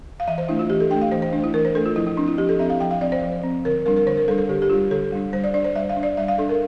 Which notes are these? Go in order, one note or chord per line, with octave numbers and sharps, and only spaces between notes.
F5
E3 E5
C5
A3 D4 E4
F4
E3 G4
A4
A3 D4 G5
F5
E3 C5
C5
D4
A3
E4
E3 A#4
C5
A3 D4 A4
F4
F3 E4
E4
C4 D4
E4
F3 G4
A4
C4 E5
F5
F3 G5
F5
C4 D5
C5
F3
C4
D3 A#4
G3 D4 A#4
A#4
D3 C5
A#4
G3 D4 A4
A4
D3 G4
G4
G3 D4 F4
D3 A4
G3 D4
G3 C5
D5
D4 D5
C5
G3 E5
F5
D4
D5
G3 E5
F5
D4 A4
A#4